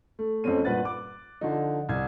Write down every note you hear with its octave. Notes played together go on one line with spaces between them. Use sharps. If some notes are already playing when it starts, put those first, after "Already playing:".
A3
F2 A3 C4 C#4 D#7
G2 A#2 B4 F#5 F#6 A6
D6
D3 F3 D#4
C2 G#6